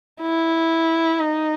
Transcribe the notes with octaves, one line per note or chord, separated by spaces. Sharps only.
E4
D#4